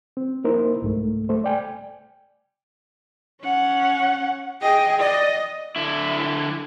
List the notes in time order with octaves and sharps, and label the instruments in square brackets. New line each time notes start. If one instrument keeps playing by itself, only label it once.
[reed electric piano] C4
A#3 D#4 E4 A#4 C5
C2 G#2 A3
A3 C5
D5 G5 G#5
[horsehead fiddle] C#4 F#5
[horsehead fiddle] G#4 D#5 [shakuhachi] G5
[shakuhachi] D5 [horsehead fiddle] D#5
[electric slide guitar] D3 E4